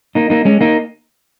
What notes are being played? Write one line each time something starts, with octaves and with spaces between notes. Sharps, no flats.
A#3 D#4
A#3 D#4
G#3 C#4
A#3 D#4